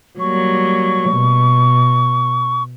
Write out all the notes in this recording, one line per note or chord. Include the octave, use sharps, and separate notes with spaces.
F#3 G3 A#3 C#6
B2